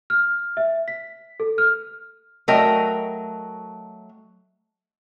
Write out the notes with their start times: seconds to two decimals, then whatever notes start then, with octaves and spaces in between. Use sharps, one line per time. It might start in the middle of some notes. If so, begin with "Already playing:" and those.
0.10 F6
0.57 E5
0.88 B6
1.40 A4
1.58 F6
2.48 F#3 A3 A#4 D#5 G5